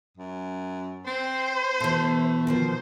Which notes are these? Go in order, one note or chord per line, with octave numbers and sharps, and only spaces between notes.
F#2
C4 C5
B2 E3 A3
B2 D#3 F3 C5